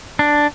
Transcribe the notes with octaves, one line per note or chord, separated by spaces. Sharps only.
D4